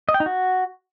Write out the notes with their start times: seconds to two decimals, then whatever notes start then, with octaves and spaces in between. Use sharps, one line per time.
0.09 D#5
0.14 G5
0.20 D#4
0.26 F#4